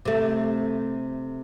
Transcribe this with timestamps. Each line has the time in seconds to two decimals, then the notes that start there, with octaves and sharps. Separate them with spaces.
0.05 C3 A3